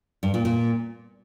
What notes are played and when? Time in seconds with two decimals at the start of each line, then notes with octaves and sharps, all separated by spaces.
0.23 G2
0.34 A#2
0.45 A#2